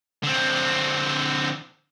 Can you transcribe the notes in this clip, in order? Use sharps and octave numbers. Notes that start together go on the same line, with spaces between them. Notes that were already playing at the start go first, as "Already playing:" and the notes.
D3 C4